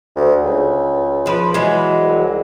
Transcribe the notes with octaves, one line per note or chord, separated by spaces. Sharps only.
D2
C#2
F3 B4
E3 F#3 G#3
C2